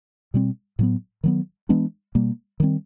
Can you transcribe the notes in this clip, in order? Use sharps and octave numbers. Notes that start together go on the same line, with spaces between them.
B2 G3 C4
A2 F#3 B3
D#3 F#3 B3
E3 G#3 B3 D4
B2 G3 A#3
D#3 G3 C4